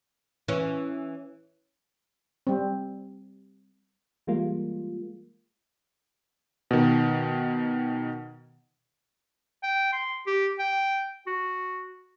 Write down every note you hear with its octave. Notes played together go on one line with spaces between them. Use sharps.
E3 C#4
G3 C4
E3 G3 G#3 A#3 F4
B2 D#3
G5
C6
G4
G5
F#4